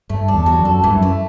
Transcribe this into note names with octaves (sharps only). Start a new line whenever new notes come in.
G2 A3
D4
E2
F#4
F#2
A4
G2 E3
F#2
A3